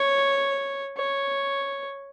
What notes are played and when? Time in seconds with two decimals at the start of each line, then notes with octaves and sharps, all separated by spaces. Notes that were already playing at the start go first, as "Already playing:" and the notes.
Already playing: C#5
0.98 C#5